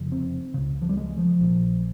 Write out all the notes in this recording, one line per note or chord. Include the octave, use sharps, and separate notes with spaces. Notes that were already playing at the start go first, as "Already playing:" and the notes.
Already playing: F1 F2 C#3
C4
C#2 C#3
F3
G3
G#3
F3
A#1 A#2